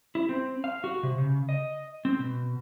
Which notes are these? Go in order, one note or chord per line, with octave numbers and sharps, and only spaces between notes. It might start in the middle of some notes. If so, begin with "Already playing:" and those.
E4
C4
F5
F#4
C3
C#3
D#5
C4
B2